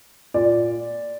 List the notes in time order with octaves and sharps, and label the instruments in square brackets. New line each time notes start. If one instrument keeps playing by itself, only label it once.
[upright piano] A#2 D5